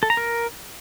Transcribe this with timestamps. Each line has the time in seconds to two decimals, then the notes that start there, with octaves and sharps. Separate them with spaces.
0.03 A4
0.10 A#5
0.17 A#4